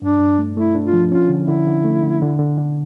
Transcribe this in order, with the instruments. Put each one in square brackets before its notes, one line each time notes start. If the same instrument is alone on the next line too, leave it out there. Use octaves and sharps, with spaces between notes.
[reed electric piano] G2 [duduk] D4
[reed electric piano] G2
A3
[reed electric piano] A3 [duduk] E4
[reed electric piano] D4
[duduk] F4
[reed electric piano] F3
[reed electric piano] C#4 [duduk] F4
[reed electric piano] D3
[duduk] E4
[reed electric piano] D3
D3
A3
D3
D3
D3
D3